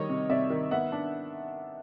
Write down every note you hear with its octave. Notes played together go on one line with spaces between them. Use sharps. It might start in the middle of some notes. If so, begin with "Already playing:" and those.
Already playing: D#3 G3 C#5 D#5
C3
C3 D5 E5
D#3
B3 E5 F#5
D4